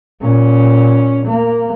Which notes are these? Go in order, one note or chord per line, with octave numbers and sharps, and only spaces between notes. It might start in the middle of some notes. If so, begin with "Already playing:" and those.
A#2 C#4
A#3